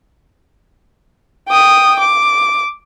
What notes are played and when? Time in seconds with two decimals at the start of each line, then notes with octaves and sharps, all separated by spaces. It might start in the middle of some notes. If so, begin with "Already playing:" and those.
1.49 G5 D#6
1.99 D6